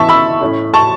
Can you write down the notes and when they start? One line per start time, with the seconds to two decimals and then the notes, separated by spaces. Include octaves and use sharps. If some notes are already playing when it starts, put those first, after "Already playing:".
Already playing: E3 B3 E5 A5 C#6
0.09 B5 E6
0.41 A2 A3 C#4
0.74 A5 C#6